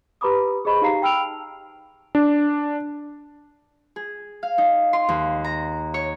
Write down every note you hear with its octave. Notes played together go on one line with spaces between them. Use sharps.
G4 B4 A#5 B5 D6 D#6
G#4 C5 D#5 B5 C#6
D#4 G4 F5 A#5 C7
G5 B5 E6 F6 D7 F7
A5
D4
G#4
F5
D#4
C6
D#2
A#5
C#5